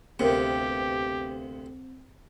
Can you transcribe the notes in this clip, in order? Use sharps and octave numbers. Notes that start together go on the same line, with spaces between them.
D2 C3 B3 C4 G4 A#4 F5